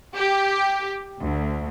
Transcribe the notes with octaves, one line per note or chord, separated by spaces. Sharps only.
G4
D2